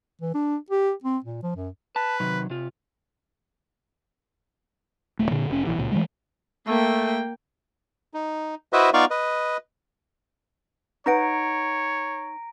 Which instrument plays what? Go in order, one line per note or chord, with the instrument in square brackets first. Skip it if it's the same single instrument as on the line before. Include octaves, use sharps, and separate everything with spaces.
[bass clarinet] E3
D4
G4
C4
A#2
F3
F#2
[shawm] B4 [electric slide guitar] A5
[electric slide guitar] C3 D#3 F#3
C3 F4
[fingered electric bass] D#1 A3
A#2 D3
F1 C#4
A#1 E3
C#2 A#2
E3 F3 G#3 A3
[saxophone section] A3 [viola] A#3 G5
[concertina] D#4
E4 F#4 B4 C5 D#5 E5
B3 D#4 F4 D5 F5 C#6
B4 D#5
[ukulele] D#4 B4 F#5 [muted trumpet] C#5 [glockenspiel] A#5 A#6 D7